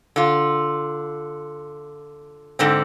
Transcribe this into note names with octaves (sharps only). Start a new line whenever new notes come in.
D3 F4
G#2 D3 C4